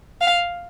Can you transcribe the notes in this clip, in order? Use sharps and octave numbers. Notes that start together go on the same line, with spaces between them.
F5